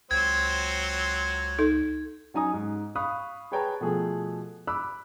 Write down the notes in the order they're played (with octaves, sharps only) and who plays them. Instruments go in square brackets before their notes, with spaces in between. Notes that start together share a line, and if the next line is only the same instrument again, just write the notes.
[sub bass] C#2 [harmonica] F#3 C4 C5 [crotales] G#6
[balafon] D#4 A4
[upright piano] F#3 C#4 D#4 G#5 A#5 D#6
G#2
F5 B5 C#6 D#6 F#6
G#4 B4 C#5 G5 A5 A#5
B2 F3 A3 G#4
B5 D6 E6 F#6